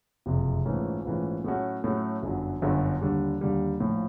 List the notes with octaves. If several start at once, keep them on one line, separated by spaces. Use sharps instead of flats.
F#1 F2 C3
A#1 G#2 E3 A3 C#4
A#1 G#2 E3 A3 C#4
A2 F#3 A3 C#4 F#4
A2 F#3 A3 C#4 F#4
G1 F#2 D3 F#3
G1 F#2 D3 F#3
D#2 D3 G3
D#2 D3 G3
A#1 A2 F3